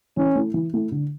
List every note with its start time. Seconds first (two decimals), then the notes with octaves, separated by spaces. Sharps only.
0.17 E3 C#4
0.35 A3 E4
0.54 E3
0.73 A3 E4
0.92 D3